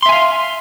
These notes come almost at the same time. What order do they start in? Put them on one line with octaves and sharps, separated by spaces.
C6 E5 G#5 F5